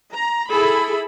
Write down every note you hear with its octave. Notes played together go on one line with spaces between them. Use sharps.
A#5
E4 G#4 A4 B5